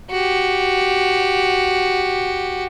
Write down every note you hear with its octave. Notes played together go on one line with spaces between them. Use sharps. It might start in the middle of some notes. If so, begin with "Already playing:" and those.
F#4 G4